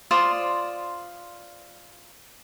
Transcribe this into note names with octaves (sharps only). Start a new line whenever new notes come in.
F4 C5 D5 D#6